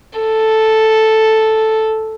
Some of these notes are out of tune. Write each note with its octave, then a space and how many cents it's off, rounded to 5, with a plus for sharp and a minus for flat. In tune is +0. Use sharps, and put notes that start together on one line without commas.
A4 +0